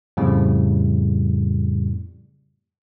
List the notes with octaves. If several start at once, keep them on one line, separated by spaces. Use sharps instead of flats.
F2 A2 C#3 G3